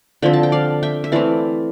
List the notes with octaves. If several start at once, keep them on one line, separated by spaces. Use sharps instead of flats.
D3 F3 C4 E5 G5
A5
G5
D5 F5
E5 G5
E5
E3 A3 C4 D5 F5